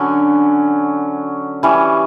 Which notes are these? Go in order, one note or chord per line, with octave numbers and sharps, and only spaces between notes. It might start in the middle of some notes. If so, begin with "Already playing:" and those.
Already playing: D3 F#3 C#4
E3 G3 C#4